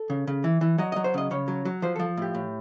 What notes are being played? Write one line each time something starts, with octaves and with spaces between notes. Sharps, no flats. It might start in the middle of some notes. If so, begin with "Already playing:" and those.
Already playing: A4
C#3
C#3
E3
E3
F#3 D#5
D#5
F#3
C5
C#3 D#5
C#3 C#5
F#3
F#3
F3 C5
F3 A4
A2 G4
A2